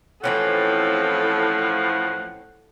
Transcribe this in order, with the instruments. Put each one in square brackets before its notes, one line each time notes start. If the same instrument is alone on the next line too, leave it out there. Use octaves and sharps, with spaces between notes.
[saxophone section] A2 F3 [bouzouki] E3 C4 C#4 [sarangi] A4 [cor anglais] F#5